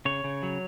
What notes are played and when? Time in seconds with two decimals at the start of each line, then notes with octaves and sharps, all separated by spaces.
0.05 C#3 C#5
0.24 C#3
0.43 F#3